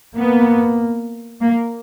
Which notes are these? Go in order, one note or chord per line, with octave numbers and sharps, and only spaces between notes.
A#3 B3
A#3